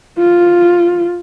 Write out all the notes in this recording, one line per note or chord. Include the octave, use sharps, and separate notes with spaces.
F4